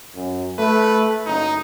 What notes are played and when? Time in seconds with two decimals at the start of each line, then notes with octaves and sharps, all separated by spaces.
0.15 F#2
0.59 A3 B4
1.26 F#1 D#4